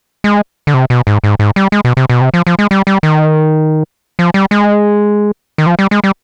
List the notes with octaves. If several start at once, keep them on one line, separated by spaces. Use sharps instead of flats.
G#3
D3
C3
B2
G#2
G#2
G#2
G3
G#3
B2
C3
B2
C3
F3
F3
G#3
G3
G3
D#3
F3
G3
G#3
D#3
F3
G3
G#3
G3